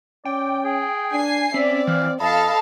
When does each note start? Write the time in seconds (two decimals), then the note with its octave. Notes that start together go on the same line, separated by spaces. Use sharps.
0.25 C#4 D5 G5
0.64 G#4
1.13 D4 G#5 C7
1.54 C4 C#4 D5 E5
1.87 E3 F5
2.20 F2 A4 D#5 F5 A5 B5